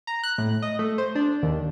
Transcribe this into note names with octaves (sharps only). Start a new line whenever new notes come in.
A#5
F#6
A2
D#5
A3
C5
D4
D#2